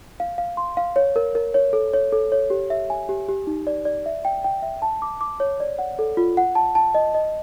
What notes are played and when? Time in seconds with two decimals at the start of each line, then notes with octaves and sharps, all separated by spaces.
0.20 F5
0.38 F5
0.57 C6
0.77 F5
0.96 C#5
1.16 A#4
1.35 A#4
1.54 C#5
1.73 A4
1.93 C#5
2.12 A4
2.32 C#5
2.50 G4
2.70 E5
2.90 G#5
3.09 G4
3.29 G4
3.47 D#4
3.67 D5
3.85 D5
4.06 E5
4.25 G5
4.44 G5
4.62 E5
4.82 A5
5.02 D6
5.21 D6
5.40 C#5
5.60 D5
5.79 F#5
5.99 A4
6.17 F4
6.37 F#5
6.55 A5
6.75 A5
6.95 D#5
7.15 D#5